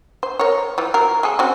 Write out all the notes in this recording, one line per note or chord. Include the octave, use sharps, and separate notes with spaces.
C5
A#4 C#5
E3 F3
F#3 A#4
G#3 G#4 A4
C4 C#4 F#4